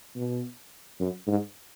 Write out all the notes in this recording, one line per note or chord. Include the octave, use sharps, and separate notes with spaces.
B2
F#2
G#2